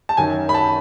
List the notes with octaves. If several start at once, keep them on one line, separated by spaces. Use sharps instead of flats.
A5
F#2 D#3 F#3 G#5
B5
A5